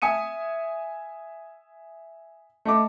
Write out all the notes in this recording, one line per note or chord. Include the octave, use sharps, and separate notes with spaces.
E5 G#5 D#6 C#7 D#7
A3 D#5 D6